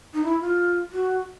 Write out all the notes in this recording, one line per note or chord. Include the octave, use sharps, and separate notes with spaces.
D#4
E4
F4
F#4